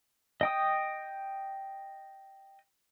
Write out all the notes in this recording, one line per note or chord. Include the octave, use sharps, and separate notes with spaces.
D#5 G5 D#6